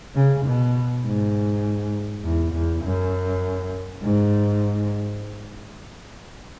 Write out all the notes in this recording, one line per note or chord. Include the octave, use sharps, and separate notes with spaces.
C#3
B2
G#2
E2
E2
F#2
G#2